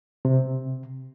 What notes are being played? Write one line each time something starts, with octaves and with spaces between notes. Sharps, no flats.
C3